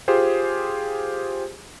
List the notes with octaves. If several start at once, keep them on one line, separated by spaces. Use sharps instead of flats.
F4 G4 G#4 C5